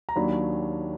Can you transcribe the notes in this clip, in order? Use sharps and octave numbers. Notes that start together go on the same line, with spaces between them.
A#5
D#2 D#3 F#3 D4 B5